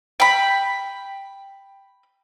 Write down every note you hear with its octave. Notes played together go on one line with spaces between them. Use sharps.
G5 B5